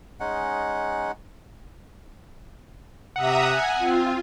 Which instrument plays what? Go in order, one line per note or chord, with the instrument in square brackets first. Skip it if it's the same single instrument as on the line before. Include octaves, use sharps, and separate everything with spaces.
[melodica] G#3 C#4 D#4 F#5
[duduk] C3 [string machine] E5 A#5 D#6 [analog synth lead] F#5
[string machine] G#5
[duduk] C4 [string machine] F4